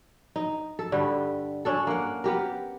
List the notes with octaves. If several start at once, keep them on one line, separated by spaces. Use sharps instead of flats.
D#4
A4
G2 D3 G3
C#4 D4 A4
A#3 F#5
B3 G4 A#4